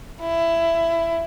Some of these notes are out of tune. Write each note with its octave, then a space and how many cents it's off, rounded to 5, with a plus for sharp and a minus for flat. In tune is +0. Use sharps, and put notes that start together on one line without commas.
E4 +15